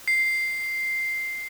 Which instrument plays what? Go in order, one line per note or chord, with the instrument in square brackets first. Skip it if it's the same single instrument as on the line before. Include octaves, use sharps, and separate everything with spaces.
[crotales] C7